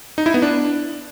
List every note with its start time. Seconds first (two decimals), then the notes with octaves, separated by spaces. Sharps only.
0.18 D#4
0.26 E4
0.34 B3
0.42 D4